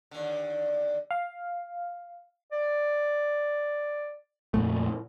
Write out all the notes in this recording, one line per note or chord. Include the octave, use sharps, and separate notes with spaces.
D#2 D3
F5
D5
F2 A#2 A3